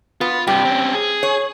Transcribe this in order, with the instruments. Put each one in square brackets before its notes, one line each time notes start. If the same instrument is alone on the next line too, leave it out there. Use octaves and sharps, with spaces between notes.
[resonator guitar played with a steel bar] B3 [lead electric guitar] F4
[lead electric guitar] G2 C3 [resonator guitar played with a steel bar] G4
[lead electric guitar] C4 C#4
G#4
[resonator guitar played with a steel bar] C#5